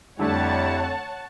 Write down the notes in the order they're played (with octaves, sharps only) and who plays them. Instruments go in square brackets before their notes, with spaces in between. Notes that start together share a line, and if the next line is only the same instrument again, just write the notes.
[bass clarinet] F2 [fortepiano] D3 A3 [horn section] G3 E4 [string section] C#5 F#5 A5